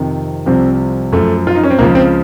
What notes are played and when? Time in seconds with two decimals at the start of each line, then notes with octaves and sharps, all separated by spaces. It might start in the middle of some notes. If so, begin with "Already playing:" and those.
Already playing: F2 C3 D#3
0.46 C2 C3 F3 C4
1.12 F#2 F3 A3
1.47 F4
1.55 D#4
1.64 C#4
1.70 C4
1.79 C#2 C#3 F3 A#3
1.95 C4